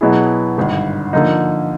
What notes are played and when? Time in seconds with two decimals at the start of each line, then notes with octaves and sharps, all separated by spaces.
0.01 B2 F#3 B3 E4 G#4
0.57 G#1 G2 D3
1.13 D3 F3 A#3 D#4